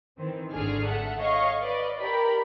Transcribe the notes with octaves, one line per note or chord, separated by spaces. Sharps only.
D#3 E3 C4
G#1 D3 A3 G#4 D5 F6
A4 E5 F#5
C#5 D#5 F5 C#6
B4 D5 D#5
G4 A#4 D5 B5